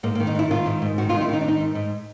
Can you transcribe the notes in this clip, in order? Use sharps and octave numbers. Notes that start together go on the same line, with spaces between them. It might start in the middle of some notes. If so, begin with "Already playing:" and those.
G#2 A#3
A#3
D#3
D#4
G#2 E4
D#3 F4
G#2
G#2
D#3 F#4
F4
D#3 D#4
E4
D#3 D#4
D4
G#2 D#4
G#2
G#2